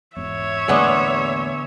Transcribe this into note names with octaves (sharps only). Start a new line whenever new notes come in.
D#1 E2 G#2 C#5 E5
E2 A2 D3 G#3 A#3 B3 D4